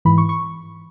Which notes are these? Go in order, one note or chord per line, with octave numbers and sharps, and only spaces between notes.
G#2 E3 B5
C#6
C#6